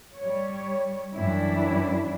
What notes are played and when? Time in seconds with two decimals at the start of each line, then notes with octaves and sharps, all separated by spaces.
0.16 G3 C#5
1.15 F#2 E3 G3 D4 E4